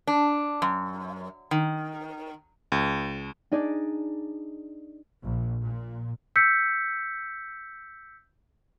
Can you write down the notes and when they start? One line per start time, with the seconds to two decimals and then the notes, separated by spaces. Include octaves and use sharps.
0.07 D4
0.62 F#2
1.51 D#3
2.72 C#2
3.52 D4 D#4 G#4 D5
5.23 A#1
5.63 A#2
6.36 E6 G6 B6 C#7